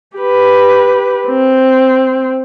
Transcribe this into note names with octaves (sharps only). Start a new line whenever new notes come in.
G4 B4
C4